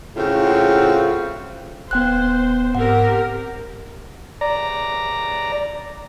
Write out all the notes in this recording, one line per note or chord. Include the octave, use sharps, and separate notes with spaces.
A2 C#3 C4 F4 F#4
D#1 B3 C5 G5 F#6
G#2 C4 G4 A#4 F#5
D5 A#5